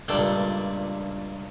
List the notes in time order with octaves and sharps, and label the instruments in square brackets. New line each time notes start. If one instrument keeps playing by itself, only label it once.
[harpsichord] C#2 G2 A#2 D4 A4 G5